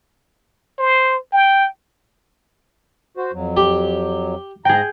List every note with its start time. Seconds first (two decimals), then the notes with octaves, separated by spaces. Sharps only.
0.78 C5
1.32 G5
3.17 F#4 C5
3.33 F2 F#3
3.57 G4
4.65 G#2 G#4 G5 A#5